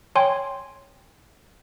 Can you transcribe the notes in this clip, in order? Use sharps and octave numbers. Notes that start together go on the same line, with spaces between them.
C#5 G5 G#5 C6